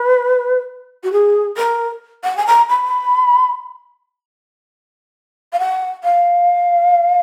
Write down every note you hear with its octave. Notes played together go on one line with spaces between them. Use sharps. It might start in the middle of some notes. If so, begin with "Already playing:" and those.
Already playing: B4
F#4
G#4
A#4
F#5
G#5
A#5
B5
F5
F#5
F5